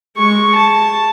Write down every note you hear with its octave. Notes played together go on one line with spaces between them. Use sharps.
G#3 C#6
A5